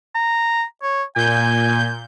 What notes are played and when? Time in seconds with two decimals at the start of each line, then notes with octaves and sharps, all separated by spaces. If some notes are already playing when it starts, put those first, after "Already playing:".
0.15 A#5
0.82 C#5
1.16 A#2 G#5 G6